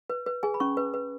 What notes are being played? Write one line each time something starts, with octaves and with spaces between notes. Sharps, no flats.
B4
B4
G#4 G#5
B5
C#4 C#6
B4
B4